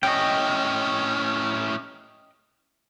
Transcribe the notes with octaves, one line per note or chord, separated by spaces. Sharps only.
A2 C#4 D#5 G5